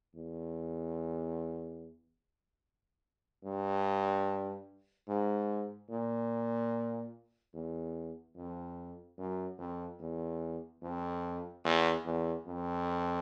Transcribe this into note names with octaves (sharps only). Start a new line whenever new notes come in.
E2
G2
G#2
A#2
E2
F2
F#2
F2
E2
F2
E2
E2
F2